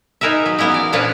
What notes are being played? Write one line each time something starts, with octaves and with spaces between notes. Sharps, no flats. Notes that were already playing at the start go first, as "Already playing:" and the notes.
D#4 G#4 A#4 B4 E5
F#3
A#3 B3 C#4 E4
E3 D5
A#2 F3 C#4 D4 F4 B4